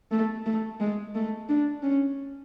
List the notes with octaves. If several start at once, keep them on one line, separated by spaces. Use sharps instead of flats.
A3
A3
G#3
A3
D4
C#4